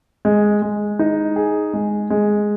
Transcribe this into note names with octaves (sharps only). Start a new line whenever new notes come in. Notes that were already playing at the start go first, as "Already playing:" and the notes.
G#3
G#3
D#4
G#4
G#3
G#3